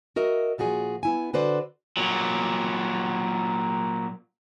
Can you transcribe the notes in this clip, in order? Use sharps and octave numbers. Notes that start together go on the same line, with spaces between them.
F#4 A#4 D#5 E5
A#2 F3 F#4 G#4
B3 E4 G#5
D3 F#4 B4 C5 D5
A#2 F#3